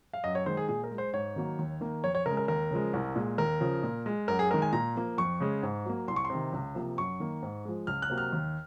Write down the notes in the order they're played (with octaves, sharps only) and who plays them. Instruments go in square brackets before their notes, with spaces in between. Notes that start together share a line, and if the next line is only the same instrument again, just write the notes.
[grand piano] F5
F#2 D#5
C#5
D#3 G#3 C5
G#4
A#2 G#4
A#4
G#3
C5
G#2 C#5
D#3 F#3 A#3
D#2
D#3 A#3
F2 C#5
C#5
C#3 G#3 A#4
A#4
D#2 A#4
C#3 F3 G#3
C2
A#2 G#3
D#2 A#4
C#3 F3
A#2
G#3
F#2 A#4
G#4
G#3 A#4
D#3
G#5
A#2 A#5
F3 A#3
F2 C#6
C#3 G#3
G#2
F#3 A#3
C2 C6
C#6
C6
C3 D#3
C#2
C3 F3 A#3
F#2 C#6
D#3 A#3
G#2
F3 G#3
C#2 F6
F#6
C3 F#3 A#3
F6
D#2